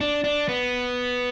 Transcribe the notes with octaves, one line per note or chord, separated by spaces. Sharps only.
D4
D4
B3